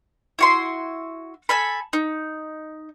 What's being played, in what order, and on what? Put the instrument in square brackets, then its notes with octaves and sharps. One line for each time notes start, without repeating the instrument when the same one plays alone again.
[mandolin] E4 F#4 C6
A4 G#5 B5
D#4